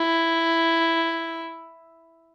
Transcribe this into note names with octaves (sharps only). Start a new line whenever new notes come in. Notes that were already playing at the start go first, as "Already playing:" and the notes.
Already playing: E4